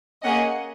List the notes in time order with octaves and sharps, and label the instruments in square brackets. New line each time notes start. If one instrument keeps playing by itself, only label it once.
[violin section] A#3 C#4 G#4 D#5 F#5